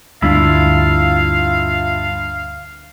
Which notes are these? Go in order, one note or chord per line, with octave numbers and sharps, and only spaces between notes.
D2 G2 E4 F4 F5